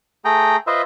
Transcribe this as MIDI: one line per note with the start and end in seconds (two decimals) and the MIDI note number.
0.25 0.57 57
0.25 0.57 68
0.25 0.57 79
0.25 0.57 82
0.67 0.82 65
0.67 0.82 71
0.67 0.82 72
0.67 0.82 75
0.67 0.82 76